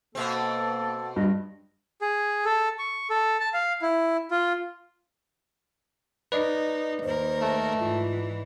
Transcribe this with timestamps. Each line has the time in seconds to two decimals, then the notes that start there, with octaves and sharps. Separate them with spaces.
0.15 B2 A#3 C4 A4
1.16 G2 D#5
2.01 G#4
2.45 A4
2.79 C#6
3.10 A4
3.40 A5
3.54 F5
3.82 E4
4.31 F4
6.32 D#4 B4 D5 D#5
7.04 D#2 A#4 C5
7.41 A3
7.79 G#2 E3 F4